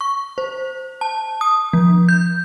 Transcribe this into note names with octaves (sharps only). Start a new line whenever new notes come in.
C#6
C5
A5
D#6
F3
G6